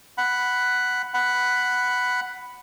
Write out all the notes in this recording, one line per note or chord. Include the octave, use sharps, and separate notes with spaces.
F#5 B5
F#5 B5